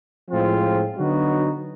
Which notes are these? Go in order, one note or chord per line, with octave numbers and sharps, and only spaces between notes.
A2 F3 G#3 C4 F4
D3 F#3 B3 D#4 F#4